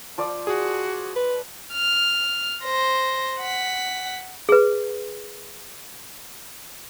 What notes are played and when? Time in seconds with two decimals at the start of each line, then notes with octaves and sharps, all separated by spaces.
0.18 F3 D5 E6
0.47 F#4 G#4
1.16 B4
1.73 F6
2.64 C5 A#6
3.40 F#5 B6
4.49 G#4 B4